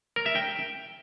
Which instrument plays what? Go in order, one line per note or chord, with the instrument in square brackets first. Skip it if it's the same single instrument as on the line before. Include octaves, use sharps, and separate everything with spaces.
[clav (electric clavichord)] A#4
E5
G5